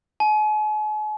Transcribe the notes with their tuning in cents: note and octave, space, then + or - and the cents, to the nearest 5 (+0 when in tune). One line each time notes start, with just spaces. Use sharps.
G#5 +45